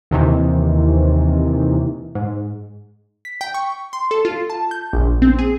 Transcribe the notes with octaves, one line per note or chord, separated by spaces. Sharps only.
D#2 C3 D#3 E3
G#2
B6
G5
C#6
C6
A4
F4
A5
G6
A#1
C4
G#4